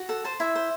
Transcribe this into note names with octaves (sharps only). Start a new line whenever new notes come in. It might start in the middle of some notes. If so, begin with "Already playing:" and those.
Already playing: F#4
A4 F#5
C5 A5
E4 E5
C5